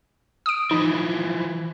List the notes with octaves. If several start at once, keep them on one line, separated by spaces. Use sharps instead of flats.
D#6 D7
E3 F3 D#4